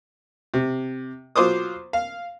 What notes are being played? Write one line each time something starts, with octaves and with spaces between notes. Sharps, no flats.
C3
F#3 F4 C5 D6 D#6
F5